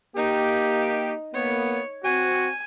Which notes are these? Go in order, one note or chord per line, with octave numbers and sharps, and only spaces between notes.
A#3 D#4 G4
A#3 B3 C#5
C4 F#4 G#5